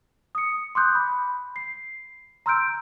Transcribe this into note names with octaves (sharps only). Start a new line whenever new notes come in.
D#6 C#7
C6 D6 D#6 F#6 G6
B5
C7
A#5 C6 E6 F6 G6 D7